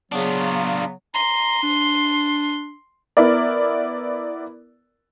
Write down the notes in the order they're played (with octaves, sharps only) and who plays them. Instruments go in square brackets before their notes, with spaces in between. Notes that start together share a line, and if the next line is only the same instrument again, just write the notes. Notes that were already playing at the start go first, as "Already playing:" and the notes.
[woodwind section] C#3 F#3 B3 [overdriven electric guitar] D4 F4
[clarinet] A#5 [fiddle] C6
[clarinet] D4
[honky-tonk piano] B3 E4 A#4 D5